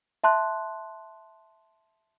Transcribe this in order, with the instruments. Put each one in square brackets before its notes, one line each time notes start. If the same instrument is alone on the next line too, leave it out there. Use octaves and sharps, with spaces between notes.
[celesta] E5 A5 C6 F#6